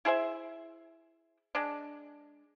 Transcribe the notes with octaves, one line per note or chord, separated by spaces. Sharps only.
E4 G#4 C5 E5
G#3 D4